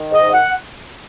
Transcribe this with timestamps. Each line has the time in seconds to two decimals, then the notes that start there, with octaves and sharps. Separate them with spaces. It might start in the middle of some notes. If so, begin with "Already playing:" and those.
Already playing: D#3
0.11 G#2 D#5
0.32 F#5